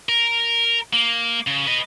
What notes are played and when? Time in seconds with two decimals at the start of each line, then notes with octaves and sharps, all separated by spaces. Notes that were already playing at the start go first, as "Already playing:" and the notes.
0.09 A#4
0.93 A#3
1.47 C#3
1.67 B4 D#5